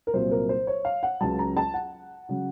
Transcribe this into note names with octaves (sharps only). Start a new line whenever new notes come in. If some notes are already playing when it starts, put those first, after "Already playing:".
A#4
C2 A#2 F#3 C5
A#4
C5
C#5
F5
F#5
C#2 C#3 F#3 A5
A#5
A5
F#5
C#3 F#3